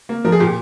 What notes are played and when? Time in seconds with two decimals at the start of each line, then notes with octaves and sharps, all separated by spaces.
0.09 A#3
0.25 F3 A#4
0.32 G#4
0.40 A#2 G4